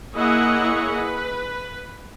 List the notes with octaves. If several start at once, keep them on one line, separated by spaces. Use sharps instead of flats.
A#3 E4 G#4 C#5 D#5 F#5
B4